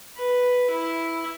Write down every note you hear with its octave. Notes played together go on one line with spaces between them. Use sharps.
B4
E4